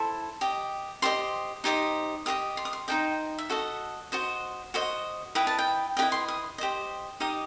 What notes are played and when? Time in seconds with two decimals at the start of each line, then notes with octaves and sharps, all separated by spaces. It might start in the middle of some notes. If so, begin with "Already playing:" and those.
Already playing: E4 A4 C5 C6
0.41 G4 D#5
1.02 G4 C5 D#5 C6
1.64 D#4 G4 C5 D#5
2.26 G4 C5 D#5 D#6
2.57 C6
2.65 D#6
2.73 C6
2.88 D#4 A4 C5 D#5 G5
3.38 E5
3.50 F#4 A4 D#5 F#5
4.12 F#4 C5 D#5
4.74 F#4 C5 D#5
5.35 E4 B4 D#5 G5
5.47 A5
5.59 G5
5.97 G4 B4 D#5 G5
6.02 E4
6.12 C6
6.28 D#6
6.58 G4 C5 D#5
7.20 D#4 G4 D#5 D#6